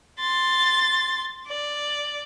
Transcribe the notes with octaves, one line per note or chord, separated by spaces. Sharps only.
C6 A6
D5